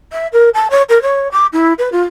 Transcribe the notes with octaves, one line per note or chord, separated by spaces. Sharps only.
E5
A#4
A5
C#5
A#4
C#5
D6
E4
B4
F4